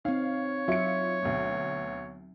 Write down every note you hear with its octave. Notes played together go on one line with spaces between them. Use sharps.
C4 D#4 C#5 F5
F#3 F4 E5 C#7
D2 B2